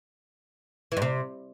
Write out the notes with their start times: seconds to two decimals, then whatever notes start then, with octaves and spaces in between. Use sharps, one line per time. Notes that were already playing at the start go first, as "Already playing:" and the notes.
0.92 E3
0.97 G2
1.02 C3